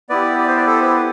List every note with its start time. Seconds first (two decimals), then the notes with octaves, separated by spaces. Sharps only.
0.09 B3 E4 G4 B4 D5
0.38 D5
0.48 C5
0.57 B4 D5
0.67 A4 C5
0.82 B4
0.96 B4